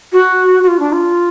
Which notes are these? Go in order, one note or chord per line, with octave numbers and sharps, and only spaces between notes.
F#4
F#4
F4
D4
F4